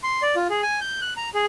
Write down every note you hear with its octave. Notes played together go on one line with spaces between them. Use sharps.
C6
D5
F4
G#4
G#5
G6
F#6
A#5
G#4